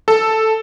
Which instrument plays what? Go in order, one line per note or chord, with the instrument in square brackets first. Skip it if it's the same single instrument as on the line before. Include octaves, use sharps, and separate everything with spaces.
[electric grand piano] A4